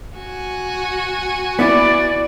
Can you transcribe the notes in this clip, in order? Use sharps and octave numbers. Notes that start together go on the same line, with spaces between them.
F#4 G#5
B3 E4 D5